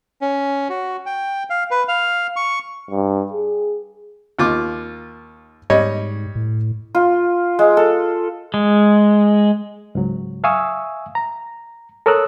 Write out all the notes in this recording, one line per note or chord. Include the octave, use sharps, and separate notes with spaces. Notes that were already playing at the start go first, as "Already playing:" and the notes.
C#4
F#4
G5
F5
B4
F5
C#6
G2
G#4
D#2 F4 D6
G#2 G3 C#5 D#5
A2
F4
G#3
A4
G#3
C#2 G#2 F#3
E5 F5 G#5 C#6 D#6 E6
A#5
A4 A#4 C#5 D#6 E6 F#6